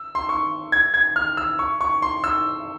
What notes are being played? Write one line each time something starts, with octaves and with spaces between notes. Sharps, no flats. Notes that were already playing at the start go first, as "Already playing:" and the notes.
Already playing: E6
C6
C#6
G#6
G#6
F6
E6
C#6
C#6
C6
E6